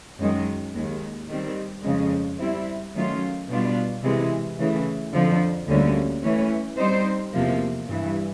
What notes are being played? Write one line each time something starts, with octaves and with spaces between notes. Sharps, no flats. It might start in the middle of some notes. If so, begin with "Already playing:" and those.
F#2 D#3 G#3
D#2 D#3 G#3
D#3 G3 C4
F2 C#3 F3 G#3
G3 C4 E4
D#3 F#3 A3 C#4 F4
B2 G3 B3 D4 F4
C3 E3 G#3
C#3 E3 A3
F2 D3 F3
D2 D3 G3 A#3 C#4
E3 A3 C#4
G3 C4 D#4 G4 C5
E2 C3 F3 A#3
G2 E3 G3